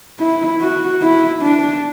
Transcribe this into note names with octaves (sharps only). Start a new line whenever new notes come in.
E4
F#4
E4
D4